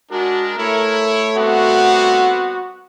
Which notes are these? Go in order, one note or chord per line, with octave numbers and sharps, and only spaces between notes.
G#3 D4 F#4 A#4
A3 E4 C#5
G3 B3 C4 F#4